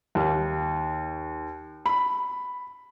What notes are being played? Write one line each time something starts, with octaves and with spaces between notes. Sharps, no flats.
D#2
B5